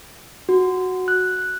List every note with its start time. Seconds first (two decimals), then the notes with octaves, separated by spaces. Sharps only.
0.49 F#4
1.08 F#6